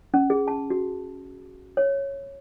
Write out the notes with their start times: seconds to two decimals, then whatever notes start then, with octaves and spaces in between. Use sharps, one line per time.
0.14 C#4
0.30 G#4
0.48 A5
0.70 F#4
1.77 C#5